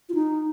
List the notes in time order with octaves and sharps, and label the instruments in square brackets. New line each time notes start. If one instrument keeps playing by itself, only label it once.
[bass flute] F4
D#4